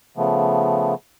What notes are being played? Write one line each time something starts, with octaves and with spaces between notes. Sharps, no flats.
C#3 F3 A3 B3